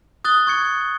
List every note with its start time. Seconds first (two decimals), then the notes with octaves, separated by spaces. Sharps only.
0.24 D#6 F#6 A6 G7
0.47 C#6 G#6 C#7